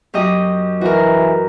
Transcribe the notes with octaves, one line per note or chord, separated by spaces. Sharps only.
F#2 G4 D#5
E3 F#4 A#4